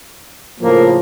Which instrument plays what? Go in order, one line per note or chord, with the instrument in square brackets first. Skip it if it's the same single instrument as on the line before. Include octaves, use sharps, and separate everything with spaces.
[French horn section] A2 C#3 F3 [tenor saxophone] A#3